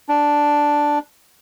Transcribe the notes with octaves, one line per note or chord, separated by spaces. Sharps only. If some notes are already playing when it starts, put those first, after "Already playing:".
D4